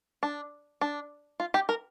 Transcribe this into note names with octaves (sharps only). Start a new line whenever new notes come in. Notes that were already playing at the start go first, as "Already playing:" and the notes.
D4
D4
F4
G4
A#4